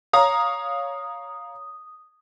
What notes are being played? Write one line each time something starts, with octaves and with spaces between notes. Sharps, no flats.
C#5 F5 A#5 D#6